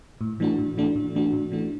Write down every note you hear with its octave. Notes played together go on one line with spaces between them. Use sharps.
A2
E3 A3 D4 F#4
A2
E3 A3 D4 F#4
A2
E3 A3 D4 F#4
A2
E3 A3 D4 F#4